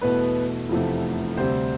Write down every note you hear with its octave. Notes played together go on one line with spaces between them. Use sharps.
E2 B2 A3 B3 B4
F1 E2 C3 F3 A3
D2 C3 G3 C4 C5